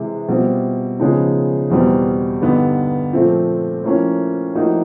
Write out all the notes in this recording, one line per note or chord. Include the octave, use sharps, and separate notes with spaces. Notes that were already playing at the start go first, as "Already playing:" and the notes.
Already playing: C3 E3 G#3
B2 G3 C4 F4
C#3 F3 G#3 B3 D#4
E2 B2 G3 C4
G2 D3 G3 B3 D#4
A#2 F3 A3 C4 F4
A2 F3 A#3 C#4
A2 F3 A#3 D#4 F#4